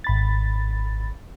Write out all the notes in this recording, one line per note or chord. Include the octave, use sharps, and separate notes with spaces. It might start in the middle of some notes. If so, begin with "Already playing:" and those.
G#1 B5 A6